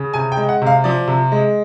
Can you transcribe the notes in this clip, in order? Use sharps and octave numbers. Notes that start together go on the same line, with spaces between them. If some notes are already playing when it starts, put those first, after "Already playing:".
Already playing: C#3
C3 G#5
G5
G#3
F#5
C3 F5
F3 D5
C3
G#3